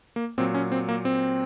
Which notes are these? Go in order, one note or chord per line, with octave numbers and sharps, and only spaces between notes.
A#3
A#2 F#3 C4
C#4
C4
A#3
C4